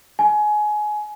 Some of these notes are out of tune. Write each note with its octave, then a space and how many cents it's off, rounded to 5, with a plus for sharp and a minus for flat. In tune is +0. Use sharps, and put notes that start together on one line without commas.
G#5 +25